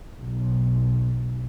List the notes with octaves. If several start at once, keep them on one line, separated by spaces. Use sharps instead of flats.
B1